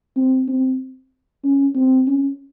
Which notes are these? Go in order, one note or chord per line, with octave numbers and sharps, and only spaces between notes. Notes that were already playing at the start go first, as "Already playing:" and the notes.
C4
C4
C#4
C4
C#4